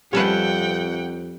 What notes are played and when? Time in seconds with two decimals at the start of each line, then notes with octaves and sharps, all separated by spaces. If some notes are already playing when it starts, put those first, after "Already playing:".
0.13 F2 G3 C#4 A4 B4 F#5 G5